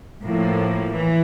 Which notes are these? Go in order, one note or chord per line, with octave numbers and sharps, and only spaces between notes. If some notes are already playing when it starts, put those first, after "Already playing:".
A2 F3 A#3
E3